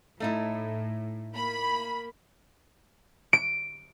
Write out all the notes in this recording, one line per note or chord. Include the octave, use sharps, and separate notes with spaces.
A2 A3 D#4 E4
A#3 B5
D7